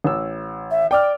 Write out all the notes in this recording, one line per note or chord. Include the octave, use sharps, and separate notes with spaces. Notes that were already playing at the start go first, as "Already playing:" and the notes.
A1 E6
E5
D5 G5 D6 F6